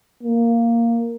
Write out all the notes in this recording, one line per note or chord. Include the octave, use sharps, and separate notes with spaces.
A#3